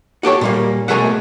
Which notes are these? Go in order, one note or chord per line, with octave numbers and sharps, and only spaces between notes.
F#4 G4 A4 C#5
A#2 G3 A#3
B2 A3 G#4 A#4 E5 F#5